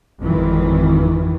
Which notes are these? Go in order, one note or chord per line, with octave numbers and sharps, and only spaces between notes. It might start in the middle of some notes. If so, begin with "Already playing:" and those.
G#1 F2 D#3 E3